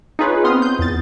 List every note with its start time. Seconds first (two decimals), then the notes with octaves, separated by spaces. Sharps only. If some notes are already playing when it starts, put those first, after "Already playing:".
0.19 D#4 F4 G#4 B4 C#5
0.44 B3 C4 C6 D#6 F6
0.62 G6
0.79 E2 A6